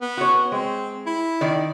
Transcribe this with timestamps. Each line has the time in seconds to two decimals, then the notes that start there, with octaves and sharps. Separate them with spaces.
0.01 B3
0.17 F#4 C#5
0.52 G#3 C4
1.06 E4
1.41 D#3 D5